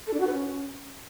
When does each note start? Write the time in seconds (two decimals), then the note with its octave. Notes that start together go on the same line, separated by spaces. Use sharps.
0.07 A4
0.13 D4
0.20 F#4
0.27 B4
0.33 C#4